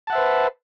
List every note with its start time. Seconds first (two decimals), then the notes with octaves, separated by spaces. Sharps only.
0.07 A5
0.10 F#5
0.13 E5
0.15 C5
0.18 B4